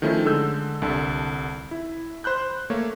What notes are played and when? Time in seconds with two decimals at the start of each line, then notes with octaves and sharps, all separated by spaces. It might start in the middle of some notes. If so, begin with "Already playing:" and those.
0.02 D#3 F3 A3 C#4 E4
0.25 D3 G#3 A4 E6 G6
0.82 C2 D3 A5
1.71 E4
2.24 C5 B5 F#6 G6
2.70 A3 A#3 C#5